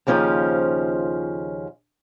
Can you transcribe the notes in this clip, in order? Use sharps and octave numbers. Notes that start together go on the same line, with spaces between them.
D#2 C#3 F3 C#4 F4 C5